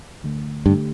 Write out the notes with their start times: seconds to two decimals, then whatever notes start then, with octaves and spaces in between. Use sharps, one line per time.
0.23 D2 D3 A3
0.66 G2 D3 A3 D4 G4